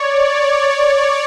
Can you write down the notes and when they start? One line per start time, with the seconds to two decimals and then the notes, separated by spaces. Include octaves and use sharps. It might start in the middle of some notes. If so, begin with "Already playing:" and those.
Already playing: C#5 D5
0.29 C#5